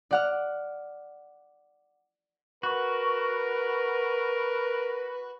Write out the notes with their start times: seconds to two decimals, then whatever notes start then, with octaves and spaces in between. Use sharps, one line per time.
0.11 D5 F#5 F6
2.63 F#4 A#4 B4